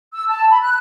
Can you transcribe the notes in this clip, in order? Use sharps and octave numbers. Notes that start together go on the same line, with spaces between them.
E6
A5
B5
F#6